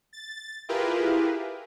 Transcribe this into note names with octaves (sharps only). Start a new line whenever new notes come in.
A6
E4 F4 G4 G#4 A#4 B4